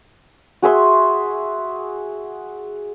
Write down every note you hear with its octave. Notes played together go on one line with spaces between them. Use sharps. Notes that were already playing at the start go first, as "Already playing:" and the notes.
F#4 G#4 E5 C6